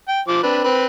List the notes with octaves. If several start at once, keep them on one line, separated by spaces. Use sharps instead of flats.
G5
F3 C5 D6
C4 D4 B4
C4 B4